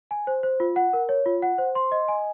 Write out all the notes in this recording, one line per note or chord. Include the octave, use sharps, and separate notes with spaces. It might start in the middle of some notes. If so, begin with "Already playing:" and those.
G#5
C5
C5
F4
F#5
A#4
C#5
F4
F#5
C5
C6
D#5
G#5